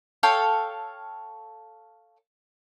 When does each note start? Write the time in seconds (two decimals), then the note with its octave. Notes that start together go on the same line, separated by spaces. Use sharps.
0.23 A4 C#5 F5 G5